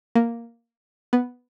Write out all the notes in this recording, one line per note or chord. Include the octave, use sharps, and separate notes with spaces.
A#3
B3